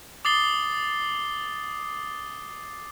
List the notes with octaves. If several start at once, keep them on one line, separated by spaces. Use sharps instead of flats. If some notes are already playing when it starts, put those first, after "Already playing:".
D6 D#6 A6 C7 G7